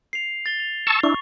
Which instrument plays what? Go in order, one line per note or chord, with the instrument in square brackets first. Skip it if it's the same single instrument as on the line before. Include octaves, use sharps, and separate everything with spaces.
[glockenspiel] C7 F7
A6 G7
F7
[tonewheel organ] A5 C#6 E6
[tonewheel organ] D4 E4 [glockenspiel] C#6